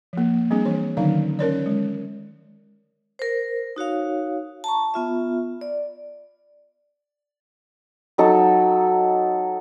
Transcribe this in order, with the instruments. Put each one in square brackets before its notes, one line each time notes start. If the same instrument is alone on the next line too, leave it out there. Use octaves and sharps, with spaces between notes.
[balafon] F3 A#3
G3 C4 D4 G#4
E3 C#5
D3 D#3 F#3 C#4 D#4 F5
C#4 A#4 C#5 D5
G#3
[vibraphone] A#4 C5
D#4 F#4 C#5 F5
A5 A#5 C#6
B3 F4 E5
D5
[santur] F#3 D#4 A4